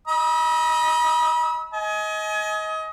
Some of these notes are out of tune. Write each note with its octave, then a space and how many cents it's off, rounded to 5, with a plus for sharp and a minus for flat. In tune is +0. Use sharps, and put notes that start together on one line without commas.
D#5 +0 B5 -40 E6 -40
D#5 +25 G#5 +30